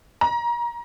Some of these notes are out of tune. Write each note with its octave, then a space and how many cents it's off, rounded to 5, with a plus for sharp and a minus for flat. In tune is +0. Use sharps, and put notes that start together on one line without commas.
A#5 +25